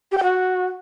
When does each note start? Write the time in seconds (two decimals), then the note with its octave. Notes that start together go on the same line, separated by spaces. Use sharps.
0.12 G4
0.17 G5
0.23 F#4